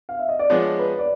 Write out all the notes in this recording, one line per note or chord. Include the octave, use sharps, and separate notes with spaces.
F5
E5
D#5
D5
F3 G#3 B3 D4 C#5
B4
D5